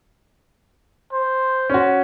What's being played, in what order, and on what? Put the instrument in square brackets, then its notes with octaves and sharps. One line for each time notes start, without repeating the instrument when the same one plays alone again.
[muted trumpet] C5
[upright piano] C#4 F#4